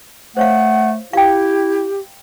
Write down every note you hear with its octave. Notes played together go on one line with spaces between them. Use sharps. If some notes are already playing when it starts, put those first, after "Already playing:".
A3 C5 C#5 F5 F#5
E4 G4 F5 G5